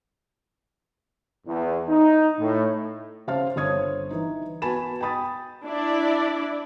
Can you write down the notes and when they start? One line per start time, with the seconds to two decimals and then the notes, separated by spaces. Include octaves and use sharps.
1.47 E2
1.89 D#4
2.39 A2
3.27 C#3 C5 F5 A5 F6
3.56 G1 C5 C#5 D#6 G#6
4.10 E3 D#4
4.62 B3 F#4 G#5 A5 B5 E7
5.01 G5 G#5 B5 D#6 A6
5.67 D4 E4 D5